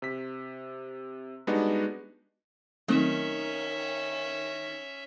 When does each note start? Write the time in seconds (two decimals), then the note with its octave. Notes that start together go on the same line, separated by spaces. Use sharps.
0.02 C3 B6
1.47 G3 G#3 B3 D4 D#4 F#4
2.88 D#3 F#3 A3 C4 C#4 E5